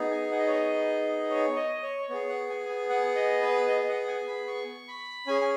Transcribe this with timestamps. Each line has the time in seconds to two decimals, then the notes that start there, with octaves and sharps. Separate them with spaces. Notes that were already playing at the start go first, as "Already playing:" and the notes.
Already playing: B3 D#4 G#4
0.11 G#5
0.31 F#5
0.38 D#5
0.47 C#5
0.55 D#5
1.30 C#5
1.56 D#5
1.83 C#5
2.09 B3 G#4 C#5
2.29 F#5
2.50 G#5
2.69 G#5
2.89 F#5
3.15 D#5
3.42 B4
3.68 D#5
3.81 D#5
3.88 F#5
4.08 G#5
4.28 B5
4.47 C#6
4.88 B5
5.27 C#4 G#4 G#5
5.41 G#5